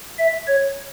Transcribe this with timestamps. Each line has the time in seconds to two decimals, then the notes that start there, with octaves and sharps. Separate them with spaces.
0.18 E5
0.47 C#5